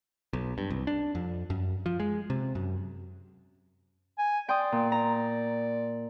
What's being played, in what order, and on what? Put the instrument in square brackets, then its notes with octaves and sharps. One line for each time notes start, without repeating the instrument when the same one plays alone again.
[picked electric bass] B1
G2
C2
D4
F2
F#2
F3
G#3
C3
F#2
[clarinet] G#5
[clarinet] D5 [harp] G5 C6 D#6
[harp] A#2
A#5